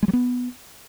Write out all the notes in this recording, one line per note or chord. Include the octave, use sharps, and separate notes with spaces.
G#3
F#3
B3